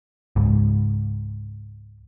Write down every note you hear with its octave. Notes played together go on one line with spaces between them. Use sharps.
C#2 G#2